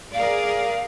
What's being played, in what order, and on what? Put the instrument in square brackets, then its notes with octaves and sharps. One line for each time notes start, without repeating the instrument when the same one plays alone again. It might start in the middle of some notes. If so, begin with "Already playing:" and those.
[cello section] G#4 A#4 D5 [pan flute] F5